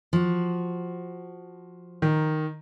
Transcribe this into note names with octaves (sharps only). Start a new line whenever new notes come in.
F3 F#4
D#3